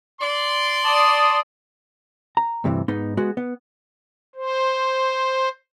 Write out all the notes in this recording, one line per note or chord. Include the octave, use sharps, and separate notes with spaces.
D5 C6
A5 D#6
A#5
D2 G2 C3 E3
G#2 B3 D#4
G#3 B3 F#4
B3
C5